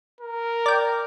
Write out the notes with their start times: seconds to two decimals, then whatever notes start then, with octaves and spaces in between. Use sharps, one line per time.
0.21 A#4
0.66 D5 G5